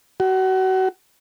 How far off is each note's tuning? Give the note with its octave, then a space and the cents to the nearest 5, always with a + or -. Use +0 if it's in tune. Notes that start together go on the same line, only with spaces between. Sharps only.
F#4 +30